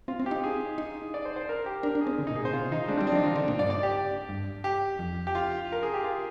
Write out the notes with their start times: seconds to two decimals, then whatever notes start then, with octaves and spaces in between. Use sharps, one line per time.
0.08 C4 F4
0.20 C4
0.26 G4
0.31 D#4
0.44 G#4
0.78 D#4
1.14 D5
1.25 C5
1.36 C5
1.49 A#4
1.66 G4
1.83 D4 A#4
1.95 D4
2.01 G#4
2.07 C4
2.18 D3
2.27 A#2 D#4
2.36 G#4
2.42 A#2
2.45 C5
2.53 C3 F4
2.71 D#3 D#4
2.88 G#3 D4
2.97 G3 C4
3.07 D4
3.12 F3
3.15 D#4
3.23 D#3 F4
3.36 D3
3.48 A#2
3.59 G2 D5
3.70 D5
3.83 G4
4.29 G2
4.64 G4
4.99 F2
5.27 G4
5.35 F4
5.72 A#4
5.83 G#4
5.94 G4
6.04 F4